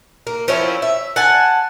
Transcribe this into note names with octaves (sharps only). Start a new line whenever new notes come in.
A#3
F3 C4 C#4 E4
E5
F#5 G#5 A5